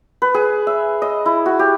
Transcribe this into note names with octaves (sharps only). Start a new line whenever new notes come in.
B4
G#4
E5
D#5
E4
F#4
G4